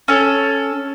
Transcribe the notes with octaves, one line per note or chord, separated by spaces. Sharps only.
C#4 A4